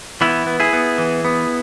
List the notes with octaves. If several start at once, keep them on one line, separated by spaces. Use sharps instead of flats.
E3 B3 E4
B3
E4 G#4
B3
E3
B3